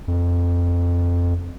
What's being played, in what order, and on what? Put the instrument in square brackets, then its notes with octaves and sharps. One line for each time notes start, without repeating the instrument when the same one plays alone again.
[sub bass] F2